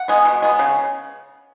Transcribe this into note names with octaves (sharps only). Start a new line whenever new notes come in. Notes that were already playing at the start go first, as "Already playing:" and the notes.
Already playing: F#5
G#3 B3
B2
G#3 B3
C#3